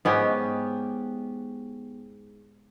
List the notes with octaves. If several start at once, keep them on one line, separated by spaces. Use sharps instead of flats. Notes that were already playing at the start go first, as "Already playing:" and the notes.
G#2 B3 C#4 G4